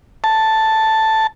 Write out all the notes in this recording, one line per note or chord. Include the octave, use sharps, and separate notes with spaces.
A5